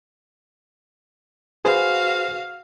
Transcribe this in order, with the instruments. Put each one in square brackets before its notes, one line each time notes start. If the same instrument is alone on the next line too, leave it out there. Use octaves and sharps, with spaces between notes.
[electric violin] F#4 F5 [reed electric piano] G#4 B4 C5